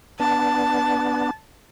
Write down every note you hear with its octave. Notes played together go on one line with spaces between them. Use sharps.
B3 D4 A5